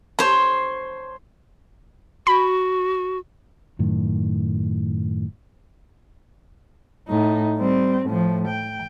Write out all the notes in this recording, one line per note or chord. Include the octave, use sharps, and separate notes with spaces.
C5 C#5 C6
F#4 B5
F#2 A2 D#3
A2 D#4
G3 C4
A2 F3
G5